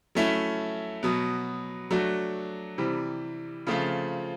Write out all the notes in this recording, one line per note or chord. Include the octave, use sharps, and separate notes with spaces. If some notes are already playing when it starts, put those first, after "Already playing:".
F#3 A3 C#4 E4
B2 F#3 B3
F#3 A3 D4 F#4
C3 E3 G3
C#3 F3 A3 C4 F4